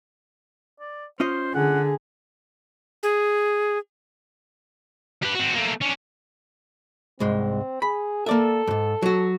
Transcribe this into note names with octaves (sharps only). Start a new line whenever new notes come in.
D5
C#4 F4 C5 D#5
D3 G#4 F#5
G#4
G4 B4
C4 F#4
A3 A#3
C#4 D4
C2 G#2 G#3 C4
G#4 B5
A#3 A4 D5 E5
F2 G#2
F#3 F#4